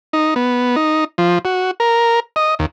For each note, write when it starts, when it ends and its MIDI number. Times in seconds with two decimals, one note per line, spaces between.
0.13 0.34 63
0.36 0.76 59
0.76 1.04 63
1.18 1.39 53
1.45 1.71 66
1.80 2.20 70
2.36 2.55 75
2.59 2.66 39